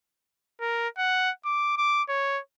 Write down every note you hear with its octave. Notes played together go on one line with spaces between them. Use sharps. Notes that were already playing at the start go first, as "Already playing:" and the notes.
A#4
F#5
D6
D6
C#5